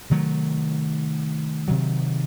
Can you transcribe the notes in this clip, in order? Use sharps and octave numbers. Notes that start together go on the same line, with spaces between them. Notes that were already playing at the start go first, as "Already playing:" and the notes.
C3 D#3 F#3 A3
C3 D#3 F#3